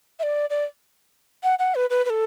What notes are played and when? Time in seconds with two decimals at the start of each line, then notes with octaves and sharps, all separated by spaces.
0.19 E5
0.23 D5
0.50 D5
1.43 F#5
1.59 F#5
1.75 B4
1.90 B4
2.05 B4
2.10 A4